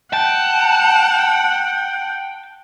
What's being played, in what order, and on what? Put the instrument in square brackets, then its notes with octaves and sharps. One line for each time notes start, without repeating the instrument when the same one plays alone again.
[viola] F#5 [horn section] G5 [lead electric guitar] A5